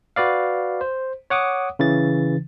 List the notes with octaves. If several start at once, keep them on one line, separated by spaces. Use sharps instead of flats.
F#4 B4 D5 F5
C5
C#5 F#5 D6 D#6
C#3 E3 A6